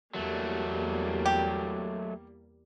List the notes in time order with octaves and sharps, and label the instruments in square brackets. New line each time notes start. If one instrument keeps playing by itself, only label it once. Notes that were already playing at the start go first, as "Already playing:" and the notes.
[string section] E2 G3 A#3 [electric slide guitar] F#3 A3
[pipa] G4